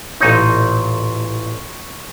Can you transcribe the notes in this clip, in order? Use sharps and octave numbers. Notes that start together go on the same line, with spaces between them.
A1 A#2 D#4 C#5 C6